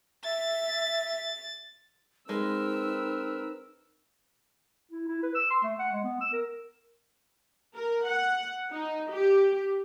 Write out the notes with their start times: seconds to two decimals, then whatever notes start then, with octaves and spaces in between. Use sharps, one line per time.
0.24 E5 A6
2.29 G#3 C4 D#4 A#4 B4 E6
4.91 E4
5.08 E4
5.23 B4
5.35 E6
5.50 C6
5.63 A3
5.79 F#5
5.92 G#3
6.04 B3
6.21 E6
6.33 A#4
7.74 A#4
8.07 F#5
8.71 D#4
9.11 G4